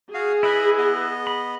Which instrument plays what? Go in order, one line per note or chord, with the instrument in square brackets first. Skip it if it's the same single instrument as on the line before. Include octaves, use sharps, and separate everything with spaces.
[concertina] F#4 F5 [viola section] G#4
[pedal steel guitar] E4 B4 [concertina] D#5 B5
[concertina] B3 D#5
[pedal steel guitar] B5